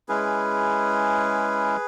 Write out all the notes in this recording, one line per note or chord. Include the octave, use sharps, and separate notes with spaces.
G#3 C#4 E4 G#4 B4